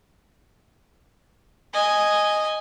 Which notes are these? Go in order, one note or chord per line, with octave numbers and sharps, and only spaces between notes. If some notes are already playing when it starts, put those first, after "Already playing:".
D#5 G#5